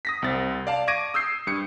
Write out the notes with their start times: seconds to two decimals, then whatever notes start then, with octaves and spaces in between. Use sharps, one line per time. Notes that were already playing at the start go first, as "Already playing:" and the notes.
0.05 D#6 A#6 B6
0.22 C2 C4 A6
0.67 D5 F5 A5
0.87 C#6 D6 G#6 A#6 D7 D#7
1.14 D#6 E6 G6 C7
1.47 G2 C#7